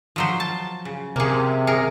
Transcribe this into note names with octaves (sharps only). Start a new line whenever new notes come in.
F3 F#3 C5
A5
C#3
C3 A#3 G#4
G#4 A#4